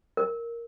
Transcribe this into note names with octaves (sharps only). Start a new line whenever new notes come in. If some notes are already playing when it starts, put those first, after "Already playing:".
A#4